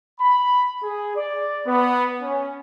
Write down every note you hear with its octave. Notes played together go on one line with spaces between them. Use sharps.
B5
G#4
D5
B3
C#4